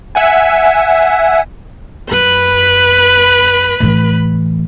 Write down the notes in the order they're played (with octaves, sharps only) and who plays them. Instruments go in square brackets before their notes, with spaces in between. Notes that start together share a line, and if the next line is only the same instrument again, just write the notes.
[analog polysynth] E5 F#5 G#5
[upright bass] F#2 [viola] B4 B5
[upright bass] A2 E3